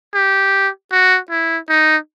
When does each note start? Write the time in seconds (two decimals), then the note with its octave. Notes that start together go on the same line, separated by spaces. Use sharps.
0.14 G4
0.91 F#4
1.30 E4
1.69 D#4